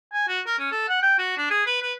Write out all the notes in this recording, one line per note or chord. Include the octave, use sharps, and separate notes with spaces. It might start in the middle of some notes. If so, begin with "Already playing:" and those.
G#5
F#4
A#4
C#4
A4
F#5
G5
F#4
D4
G#4
B4
B4